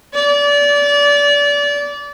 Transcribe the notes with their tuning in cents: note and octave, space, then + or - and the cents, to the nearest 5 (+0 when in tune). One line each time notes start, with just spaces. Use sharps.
D5 -25